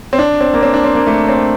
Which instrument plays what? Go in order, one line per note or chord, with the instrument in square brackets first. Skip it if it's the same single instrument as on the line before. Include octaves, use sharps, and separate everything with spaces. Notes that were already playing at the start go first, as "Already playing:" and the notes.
[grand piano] C4
D4
C4
A#3
C4
D4
C4
A#3
A3
C4